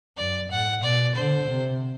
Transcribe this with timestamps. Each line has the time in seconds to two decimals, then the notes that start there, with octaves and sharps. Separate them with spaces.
0.17 F#2 D5
0.50 A2 F#5
0.83 B2 D5
1.15 D3 C5
1.49 C3